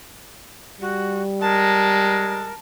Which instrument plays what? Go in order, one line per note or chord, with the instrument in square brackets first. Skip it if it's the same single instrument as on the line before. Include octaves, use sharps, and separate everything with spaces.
[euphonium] G3 [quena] F#4
[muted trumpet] G#3 [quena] A#4 [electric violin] A5